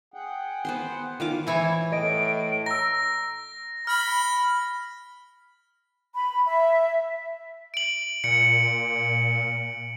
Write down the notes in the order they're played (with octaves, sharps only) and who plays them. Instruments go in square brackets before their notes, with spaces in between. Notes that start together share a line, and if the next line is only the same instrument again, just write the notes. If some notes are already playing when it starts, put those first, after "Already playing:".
[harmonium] G#4 F#5 G5
[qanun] B3 C5 C6
D#3 F4 D6
[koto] E3 E4 C#5
[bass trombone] A2 [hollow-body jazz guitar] D#5 [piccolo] D7
[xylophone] A#5 E6 [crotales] A#6
[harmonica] B5 [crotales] F6
[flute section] B5
E5
[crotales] D7 F#7
[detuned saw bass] A#2 [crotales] C#7